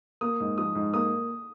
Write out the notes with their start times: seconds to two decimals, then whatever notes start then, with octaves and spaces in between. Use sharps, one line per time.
0.21 A#3 D#6
0.40 G#2
0.58 F3 D#6
0.75 G#2
0.94 A#3 D#6